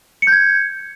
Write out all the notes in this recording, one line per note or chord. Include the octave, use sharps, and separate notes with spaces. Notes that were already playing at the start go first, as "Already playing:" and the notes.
G6 G#6 C#7